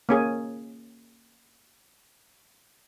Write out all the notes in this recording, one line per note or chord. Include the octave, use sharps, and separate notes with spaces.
A#3 C#4 G#4